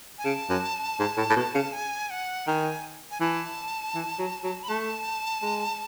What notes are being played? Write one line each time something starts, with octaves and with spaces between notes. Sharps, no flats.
G#5
C#3 A5
F#2
G#2
A2
A2
B2
C#3
G#5
F#5
D#3 G#5
G#5
E3 A5
E3
F#3
F#3
B5
A3 A5
G#3